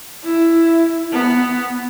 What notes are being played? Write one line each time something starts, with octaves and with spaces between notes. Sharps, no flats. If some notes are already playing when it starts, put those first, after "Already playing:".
E4
B3